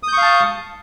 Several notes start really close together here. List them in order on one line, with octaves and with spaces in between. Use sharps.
D#6 G6 C#6 F5 A5